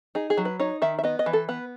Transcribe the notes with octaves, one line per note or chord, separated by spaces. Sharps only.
D#4 G#4
G#4
F#3
B4
D#4 C#5
D#3 E5
E5
B3 D#5
D#5
E3
A4
B3 B4